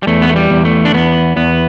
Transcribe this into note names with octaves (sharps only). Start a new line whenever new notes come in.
G3
E2 A3
B3
A3
G3
E2
A3
D4
E2 B3
E2 B3